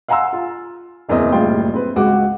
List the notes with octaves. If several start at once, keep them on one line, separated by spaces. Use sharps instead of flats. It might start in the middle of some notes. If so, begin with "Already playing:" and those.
F5 F#5 G#5 A#5 C6 E6
F4
F#1 E2 C4 A#4 D#5 E5
F#1 A2 G3 F4 G5 C6
C4 B4
C#2 G#3 F#4 D6